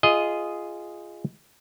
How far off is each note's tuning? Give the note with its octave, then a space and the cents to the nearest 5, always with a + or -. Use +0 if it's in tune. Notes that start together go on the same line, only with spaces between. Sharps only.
F4 -15 G#4 +0 D#5 +0